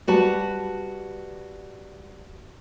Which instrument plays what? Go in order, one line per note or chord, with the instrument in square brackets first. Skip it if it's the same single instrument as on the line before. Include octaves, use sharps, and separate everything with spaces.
[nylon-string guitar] G3 F#4 B4 A5